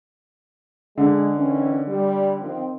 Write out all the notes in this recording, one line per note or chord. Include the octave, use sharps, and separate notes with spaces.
D3 G#3
D#3 E3 C#4
G3
D#3 F3 C4